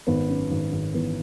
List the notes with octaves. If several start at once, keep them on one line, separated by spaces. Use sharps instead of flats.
G#1 B3
F#2
G#1
G#1
E3 B3